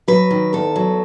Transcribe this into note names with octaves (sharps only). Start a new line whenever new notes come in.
F#3 B4
D#3
E2 A4
F#3